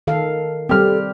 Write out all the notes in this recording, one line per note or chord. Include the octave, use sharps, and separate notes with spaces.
D#3 A4 F5
G3 C4 G4 A4 F6